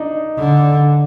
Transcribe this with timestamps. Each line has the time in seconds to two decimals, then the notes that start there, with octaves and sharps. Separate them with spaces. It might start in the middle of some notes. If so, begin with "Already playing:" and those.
Already playing: D4 D#4
0.38 D3